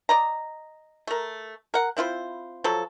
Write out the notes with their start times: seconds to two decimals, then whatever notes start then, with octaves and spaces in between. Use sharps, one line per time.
0.09 D5 D#5 A#5
1.07 A3 A#4
1.74 A#4 F#5
1.97 C4 E4 F4 C5
2.64 F3 F#3 A4